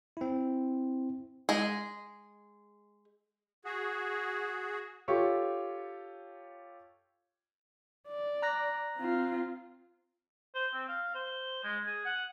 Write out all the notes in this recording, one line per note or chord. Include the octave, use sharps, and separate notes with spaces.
C4 E4
G#3 G#4
F#4 G#4
F4 G4 A4 C#5 C#6
D5
A#5 F#6 A#6
C4 F4
C5
C4
F5
C5
G#3
G#4
F#5